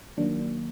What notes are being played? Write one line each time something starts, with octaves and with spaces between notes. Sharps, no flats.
D#3 F#3 A#3 D4